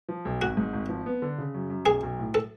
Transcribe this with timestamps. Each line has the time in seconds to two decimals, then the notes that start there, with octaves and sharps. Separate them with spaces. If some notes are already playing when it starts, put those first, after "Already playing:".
0.09 F3
0.25 B1
0.41 G#1 F#4
0.57 G#2
0.73 G#1
0.89 F3
1.06 B3
1.22 D3
1.38 C#3
1.54 F#2
1.70 F#2
1.86 B1 G#4
2.03 B1
2.19 A2
2.34 A4